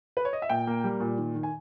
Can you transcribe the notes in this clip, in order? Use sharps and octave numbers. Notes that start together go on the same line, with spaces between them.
B4
C#5
D#5
E5
A#2 G5
A#3
G3
A#2
D#3
D#3
G#5